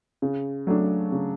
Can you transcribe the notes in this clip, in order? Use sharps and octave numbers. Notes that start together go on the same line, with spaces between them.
C#3
F#3 A3 D4
C#3